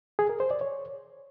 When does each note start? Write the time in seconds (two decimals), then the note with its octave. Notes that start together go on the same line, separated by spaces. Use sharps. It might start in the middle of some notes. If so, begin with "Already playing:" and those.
0.19 G#4
0.29 A#4
0.40 C5
0.51 D5
0.61 C#5